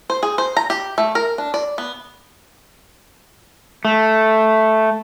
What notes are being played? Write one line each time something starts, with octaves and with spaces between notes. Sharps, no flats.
C5
G#4
C5
A#5
G4
A3
A#4
D4
D5
B3
A3